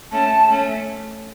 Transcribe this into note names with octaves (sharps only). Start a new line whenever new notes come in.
A3 C#4 A5
A3 C#4